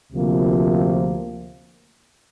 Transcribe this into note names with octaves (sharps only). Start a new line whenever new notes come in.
D2 C3 F3 A#3